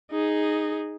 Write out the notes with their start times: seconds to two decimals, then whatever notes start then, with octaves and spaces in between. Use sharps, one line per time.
0.11 D#4 G#4